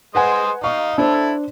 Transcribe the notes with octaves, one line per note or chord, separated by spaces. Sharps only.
G#3 B4 C5 D#5 F#5 G#5
D#4 F5 C#6
D4 E4 A4 C5